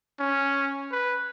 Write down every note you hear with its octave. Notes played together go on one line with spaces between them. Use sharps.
C#4
B4